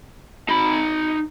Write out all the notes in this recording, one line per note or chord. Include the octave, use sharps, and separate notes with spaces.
D#4 B5